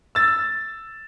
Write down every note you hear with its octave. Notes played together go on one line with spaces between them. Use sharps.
E6 A6